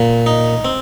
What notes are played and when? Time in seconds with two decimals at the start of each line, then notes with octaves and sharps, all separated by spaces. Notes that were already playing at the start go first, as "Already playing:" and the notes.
Already playing: A#2
0.26 D#4
0.65 C4